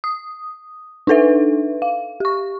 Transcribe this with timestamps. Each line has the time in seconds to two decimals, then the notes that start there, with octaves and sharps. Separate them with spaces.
0.04 D#6
1.07 D4 D#4 A4 B4 E5
1.82 F5
2.20 G4 C#6